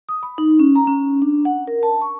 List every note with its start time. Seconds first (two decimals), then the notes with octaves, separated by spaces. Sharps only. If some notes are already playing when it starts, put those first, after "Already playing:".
0.09 D#6
0.23 B5
0.38 D#4
0.59 C#4
0.76 A#5
0.87 C#4
1.22 D4
1.45 F#5
1.67 A#4
1.83 A5
2.01 C#6